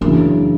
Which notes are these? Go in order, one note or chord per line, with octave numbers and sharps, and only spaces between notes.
F#2 C#3 E3 D4